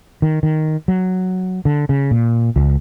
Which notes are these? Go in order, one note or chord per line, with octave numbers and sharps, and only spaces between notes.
D#3
D#3
F#3
D3
C#3
A#2
C#2